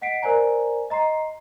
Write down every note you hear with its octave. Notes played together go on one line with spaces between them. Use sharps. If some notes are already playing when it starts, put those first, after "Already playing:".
D#5 F#5 B6 C7 D7
A#4 C5 D5 G#5 A#5
D#5 A#5 C6 C7